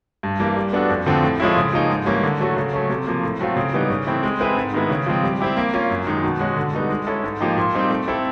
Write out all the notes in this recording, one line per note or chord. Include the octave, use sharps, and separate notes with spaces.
G2
E3 G3 A#3
G3
B3 D4 F#4 A4
F2
D3 F3 A3 C4
A2
F3 G#3 C#4 E4
C#3
F3 A#3 D#4 G#4
G#2
E3 G3 A#3 C#4
D3
F#3 A3 C#4 F#4
C#3
F#3 A3 C#4
C3
F3 A#3
A2
F#3 A3 C4 F4
C#3
E3 G3 B3 D#4
C#3
E3 A3 C4 E4
G#3
C4 E4 G#4 B4
G#2
D#3 G#3 B3 E4
C#3
F3 G#3 C4
G3
C4 E4 G4
A#3
C#4 F4
F#2
D#3 G#3
B2
G#3 C#4 F#4
D3
G3 B3 D#4 F#4
G#3
C#4 E4 A4
G#2
F3 A#3 D#4 G4
A#2
G3 C4 D#4 G4
A3
C4 E4 A4